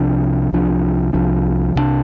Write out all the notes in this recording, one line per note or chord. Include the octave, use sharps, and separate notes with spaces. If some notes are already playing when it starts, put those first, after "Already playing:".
Already playing: C2 C3 F3 D4
C2 C3 F3 D4
C2 C3 F3 D4
C2 C3 F3 D4